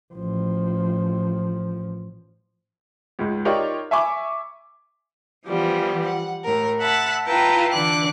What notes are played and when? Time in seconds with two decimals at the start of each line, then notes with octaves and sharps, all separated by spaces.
0.14 A1 F3
3.19 C#2 G#2
3.45 D#4 F4 G4 A#4 C#5 D5
3.91 E5 G#5 B5 C#6 D6
5.46 E3 F3 G3 B3
6.05 F#5
6.45 A2 A#4
6.79 E5 F#5 A5 B5
7.28 E4 F4 B4 G5 A5 A#5
7.72 D3 E3 D4 D6 F#6